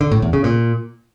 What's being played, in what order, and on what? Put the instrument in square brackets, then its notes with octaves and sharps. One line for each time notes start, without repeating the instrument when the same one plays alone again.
[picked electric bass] D3
A2
E2
C#3
A#2